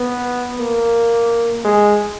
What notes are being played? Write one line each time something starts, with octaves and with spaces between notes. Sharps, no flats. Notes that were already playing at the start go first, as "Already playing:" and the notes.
Already playing: B3
A#3
G#3